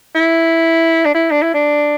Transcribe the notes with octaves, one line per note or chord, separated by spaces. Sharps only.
E4
D4
E4
D4
E4
D4